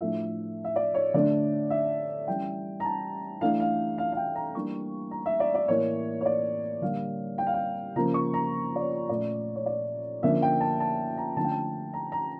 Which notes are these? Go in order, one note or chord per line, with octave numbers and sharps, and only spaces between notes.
A2 F3 A3 D4 E5
E5
D5
C#5
D3 A3 D4 D5
E5
E3 G3 C#4 G5
A#5
A5
E3 A3 D4 F5
F5
F5
F5
G5
A#5
E3 G3 A#3 D4 C#6
A#5
E5
D5
D5
A2 E3 A#3 C#5
C#5
D5
D3 G3 A#3 F5
G5
F5
G5
C#3 F3 A#3 A#5
C#6
A#5
D5
C#5
A#2 A3 C#4 D5
C#5
D5
D3 F3 A#3 C#4 E5
G5
A5
A5
A#5
D3 F3 A3 C#4 A5
G5
A5
A#5
A#5